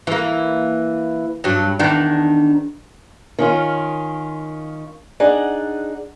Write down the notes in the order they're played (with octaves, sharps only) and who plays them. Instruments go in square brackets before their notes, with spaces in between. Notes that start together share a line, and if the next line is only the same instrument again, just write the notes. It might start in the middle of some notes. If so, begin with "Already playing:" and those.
[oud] E3 A#3
G2 F#3
E2 D#3 D4
[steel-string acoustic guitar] D#3 C#4 F4
D4 D#4 G#4 F#5